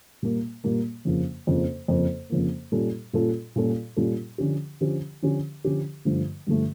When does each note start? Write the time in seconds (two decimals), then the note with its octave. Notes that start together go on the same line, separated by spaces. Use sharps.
0.22 A#2 G3 A#3
0.64 A#2 G3 A#3
1.05 F2 C#3 F3 A#3
1.47 F2 C#3 F3 A#3
1.88 F2 C#3 F3 A#3
2.30 F2 C#3 F3 A#3
2.72 A#2 G3 C#4 F4 A4
3.13 A#2 G3 C#4 F4 A4
3.56 A#2 G3 C#4 F4 A4
3.96 A#2 G3 C#4 F4 A4
4.38 D3 F3 C#4 G4
4.80 D3 F3 C#4 G4
5.22 D3 F3 C#4 G4
5.64 D3 F3 C#4 G4
6.05 G2 D3 F3 A3
6.47 G2 D3 F3 A3